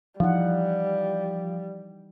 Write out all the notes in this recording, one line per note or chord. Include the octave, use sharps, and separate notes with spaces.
E3 F3 G3 D#4 F#5